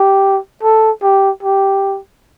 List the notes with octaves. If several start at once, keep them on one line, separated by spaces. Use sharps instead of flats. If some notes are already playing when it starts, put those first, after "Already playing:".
Already playing: G4
A4
G4
G4